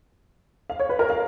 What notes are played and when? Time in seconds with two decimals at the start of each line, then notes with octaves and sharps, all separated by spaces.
0.70 F5
0.80 C#5
0.89 B4
0.99 A#4
1.10 F5